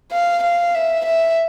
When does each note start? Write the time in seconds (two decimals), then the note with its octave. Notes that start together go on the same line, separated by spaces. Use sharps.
0.12 F5
0.43 F5
0.75 E5
1.06 E5